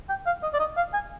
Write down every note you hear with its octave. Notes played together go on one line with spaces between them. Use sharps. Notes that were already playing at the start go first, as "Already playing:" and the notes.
G5
F5
D#5
D5
D#5
F5
G#5